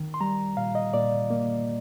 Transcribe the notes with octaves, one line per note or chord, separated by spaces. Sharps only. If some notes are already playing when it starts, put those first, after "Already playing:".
Already playing: D#3
C6
G3 A#5
A#2 F5
D#5
A#2 D5
A#3